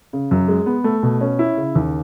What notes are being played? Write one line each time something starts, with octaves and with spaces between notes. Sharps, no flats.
C#3
F#2
G#3
B3
A3
B2
C#4
E4
C#3
D#2